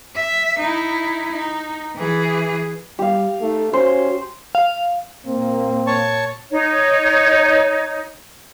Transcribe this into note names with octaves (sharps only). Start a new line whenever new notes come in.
E5
D#4 E4
D#4
E3 G#4
G3 G4 F5
A3 D#4
C#4 F#4 C5
F5
A#2 A#3 C4
C#5 A5 C#6
D#4 C#5